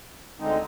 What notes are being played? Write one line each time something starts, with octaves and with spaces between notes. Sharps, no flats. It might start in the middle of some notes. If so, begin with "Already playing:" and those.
D2 D3 G#3 C4 D#4